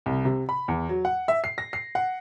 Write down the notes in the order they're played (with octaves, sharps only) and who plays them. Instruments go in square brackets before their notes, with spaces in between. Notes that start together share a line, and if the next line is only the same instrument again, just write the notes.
[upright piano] C2
C3
B5
E2
F#3
F#5
E5
C7
A#6
C7
F#5